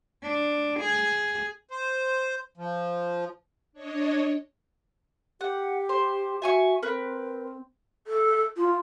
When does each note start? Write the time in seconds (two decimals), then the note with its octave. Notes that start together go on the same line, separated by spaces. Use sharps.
0.23 D4
0.80 G#4
1.71 C5
2.57 F3
3.73 D4 C#5 D#5
5.41 G4 F#5
5.89 C5
6.42 F#4 E5 G#5 C#6
6.83 C4 A#4 B4
8.07 A4
8.57 F4